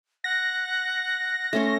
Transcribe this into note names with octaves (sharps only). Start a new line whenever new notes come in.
F#5 A#6
A3 C#4 C#5 C6